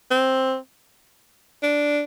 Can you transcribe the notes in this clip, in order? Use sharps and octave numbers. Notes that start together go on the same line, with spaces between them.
C4
D4